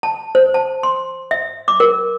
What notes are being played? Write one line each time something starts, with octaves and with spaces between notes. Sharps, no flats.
A5
C5
A5
C6
E5
D6
A#4